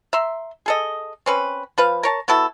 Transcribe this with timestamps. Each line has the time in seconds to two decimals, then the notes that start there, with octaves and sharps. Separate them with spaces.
0.13 E5 A#5 C6
0.66 G#4 A4 D#5
1.26 C4 C#4 B4
1.78 F3 B4 F5
2.03 A#4 C#5 A5
2.28 B3 E4 F#4 A4